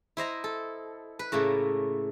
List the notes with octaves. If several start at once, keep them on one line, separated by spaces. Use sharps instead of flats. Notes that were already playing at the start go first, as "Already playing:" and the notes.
E4 C5 D#5 A#5
A4
B4
A2 C#3 A3 A#3